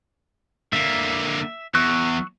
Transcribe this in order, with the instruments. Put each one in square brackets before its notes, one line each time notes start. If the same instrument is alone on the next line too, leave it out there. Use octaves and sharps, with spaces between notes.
[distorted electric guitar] D3 A#3 [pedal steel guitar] E5
[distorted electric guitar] E2 [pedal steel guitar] C#6 E6 F#6